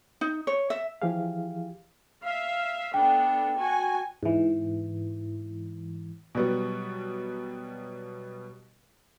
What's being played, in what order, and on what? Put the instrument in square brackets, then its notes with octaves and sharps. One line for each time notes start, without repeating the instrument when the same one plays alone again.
[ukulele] D#4
C#5
E5
[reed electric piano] E3 F3 E4 G4 G#4 F5
[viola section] E5 F5
[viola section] B3 D4 A4 [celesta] G5
[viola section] F#4 G#5
[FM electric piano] G#2 E3
[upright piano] B2 F#3 G3 B3